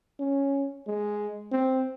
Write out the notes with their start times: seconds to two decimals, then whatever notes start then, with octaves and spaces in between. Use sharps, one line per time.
0.20 C#4
0.87 G#3
1.52 C4